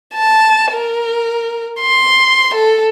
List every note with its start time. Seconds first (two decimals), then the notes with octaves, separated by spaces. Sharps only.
0.14 A5
0.73 A#4
1.81 C6
2.55 A4